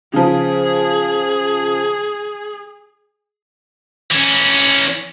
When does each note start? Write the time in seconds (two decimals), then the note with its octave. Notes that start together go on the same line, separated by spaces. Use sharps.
0.14 C#3 F3 G#4
4.11 E3 C#4